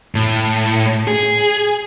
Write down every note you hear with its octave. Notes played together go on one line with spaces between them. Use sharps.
A2
G#4